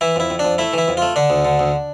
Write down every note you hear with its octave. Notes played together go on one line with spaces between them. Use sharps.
E3 E4
F2 E4
F2
D4
F2
A3 E4
E3 E4
F2
A3 F4
D3 D4
D2
D3
D2